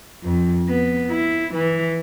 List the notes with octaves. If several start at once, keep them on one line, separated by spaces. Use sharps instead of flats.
F2
B3
E4
E3